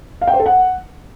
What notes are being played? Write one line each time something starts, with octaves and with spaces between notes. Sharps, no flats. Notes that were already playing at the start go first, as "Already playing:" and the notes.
F5
G5
C5
A4
F#5